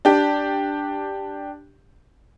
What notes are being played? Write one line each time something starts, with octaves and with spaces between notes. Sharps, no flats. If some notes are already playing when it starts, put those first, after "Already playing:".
D4 G4